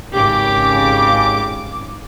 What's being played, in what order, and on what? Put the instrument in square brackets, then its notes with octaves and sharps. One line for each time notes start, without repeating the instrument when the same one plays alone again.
[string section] G#1 C#3 D6 [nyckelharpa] G4